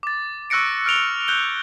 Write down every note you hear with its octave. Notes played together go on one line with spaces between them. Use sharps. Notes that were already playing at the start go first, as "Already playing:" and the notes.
D6 A6
C#6 E6 F#6 A#6 C#7 D7
F6 D7 F7 G7
F#6 G6 G7